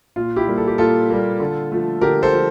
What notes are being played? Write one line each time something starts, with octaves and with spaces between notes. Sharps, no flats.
A#2 F4
E4 G4
G3 A#3
A4
G4
A#2 F4 A4
G3 A#3
D3
F3 A3
D3 G4 A#4
A4 C5
F3